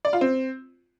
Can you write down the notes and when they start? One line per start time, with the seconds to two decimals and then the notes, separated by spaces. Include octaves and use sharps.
0.05 D5
0.13 F4
0.21 C4